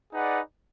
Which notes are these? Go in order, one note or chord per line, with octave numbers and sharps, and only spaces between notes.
D#4 G#4 B4 D5 F#5